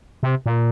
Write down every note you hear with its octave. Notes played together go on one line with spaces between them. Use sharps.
C3
A#2